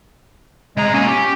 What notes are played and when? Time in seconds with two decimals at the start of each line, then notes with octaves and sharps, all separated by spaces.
0.77 C3 G#3 A#5
0.94 A#3 C#4 G#5
1.08 G4